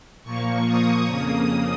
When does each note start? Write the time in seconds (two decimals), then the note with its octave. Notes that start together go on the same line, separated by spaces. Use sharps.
0.23 A#2 F3 A#3 C#6
0.66 D#6
1.06 F2 C#3 A#3